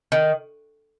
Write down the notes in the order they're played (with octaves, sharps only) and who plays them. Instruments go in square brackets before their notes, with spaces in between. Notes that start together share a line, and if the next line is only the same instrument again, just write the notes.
[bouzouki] D#3